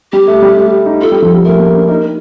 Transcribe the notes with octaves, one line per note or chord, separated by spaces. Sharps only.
G3 G4
A3
G3
A3
D#4
F4 A4
G3
F3
G3
A3 A#4
A#3
D4
D#4